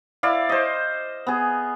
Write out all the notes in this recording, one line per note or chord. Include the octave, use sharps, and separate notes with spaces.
E4 D5 F5
C5 D#5
B3 G#4